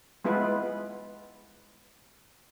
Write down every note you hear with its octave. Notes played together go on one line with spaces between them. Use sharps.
G#3 B3 E4 F4 B4